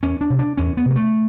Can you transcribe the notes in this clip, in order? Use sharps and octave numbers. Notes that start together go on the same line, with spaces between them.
E2 C#4
D4
C3
D4
E2 C#4
B3
C3
A#3
A3